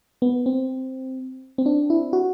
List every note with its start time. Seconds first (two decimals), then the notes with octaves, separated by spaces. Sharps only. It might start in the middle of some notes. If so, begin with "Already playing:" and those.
0.22 B3
0.46 C4
1.58 C4
1.66 D4
1.90 E4
2.13 F#4